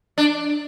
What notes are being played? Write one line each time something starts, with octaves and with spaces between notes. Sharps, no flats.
D4